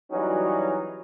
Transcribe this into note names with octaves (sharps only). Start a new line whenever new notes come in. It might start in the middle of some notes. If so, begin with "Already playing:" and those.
E3 F#3 G3 C#4 D#4 F#4